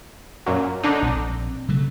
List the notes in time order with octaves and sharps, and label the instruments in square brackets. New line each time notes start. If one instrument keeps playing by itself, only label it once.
[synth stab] F#2 A#2 F#3
D3 D4 D#4
[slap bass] A#1 E3 C4
C#3 F#3 A3